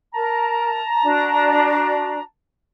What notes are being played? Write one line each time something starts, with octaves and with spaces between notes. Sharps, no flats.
A#4 A5 A#5
D4 F#4